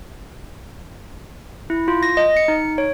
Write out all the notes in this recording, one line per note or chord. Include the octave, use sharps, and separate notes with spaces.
E4
F4
A#6
D#5
C#7
D#4
C#5